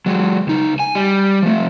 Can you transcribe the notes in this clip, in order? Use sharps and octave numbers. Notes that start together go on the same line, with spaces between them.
F#3 G#3
C#2 D#4
G#5
G3
F3 A3